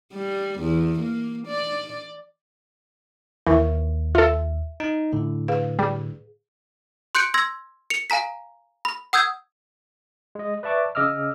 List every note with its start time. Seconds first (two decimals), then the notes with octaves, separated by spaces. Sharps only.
0.13 G3
0.60 E2
1.00 A#3
1.47 D5
3.47 D#2 E3 A#4 E5 C#6
4.15 F4 A4 E5
4.80 D#4
5.13 A2 D3
5.48 G#4 B4 F5
5.79 G3 G#4
7.15 C6 F#6 G6 C#7 D7
7.34 C6 E6 G#6 A#6
7.90 C#7 F7
8.10 F5 G#5 A#5 B6
8.85 B5
9.13 F#5 D#6 E6 G6 G#6
10.35 G#3 D#5
10.63 B4 D5 E5 A5 C#6 D6
10.95 C#3 D#5 D6 E6 F6